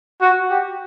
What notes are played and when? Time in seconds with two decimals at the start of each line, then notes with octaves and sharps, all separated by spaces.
0.21 F#4
0.50 G4